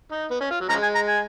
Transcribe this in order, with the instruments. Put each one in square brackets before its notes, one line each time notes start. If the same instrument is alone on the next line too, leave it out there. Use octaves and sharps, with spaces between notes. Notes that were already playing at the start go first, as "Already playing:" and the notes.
[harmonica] D#4
B3
C#4
F4
F#3
[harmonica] C#3 F3 G#3 [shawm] A#5
[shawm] G#5
A#5
G#5